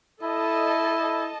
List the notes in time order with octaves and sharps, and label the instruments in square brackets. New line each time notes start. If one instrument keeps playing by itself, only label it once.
[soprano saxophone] E4 [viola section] A4 D#5 A5